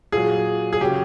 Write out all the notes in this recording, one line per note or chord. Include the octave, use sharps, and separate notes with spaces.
A#2 F#3 G#4
G#4
C#3 F#3 G4